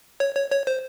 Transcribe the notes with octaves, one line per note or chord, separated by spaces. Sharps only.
C#5
C#5
C#5
C5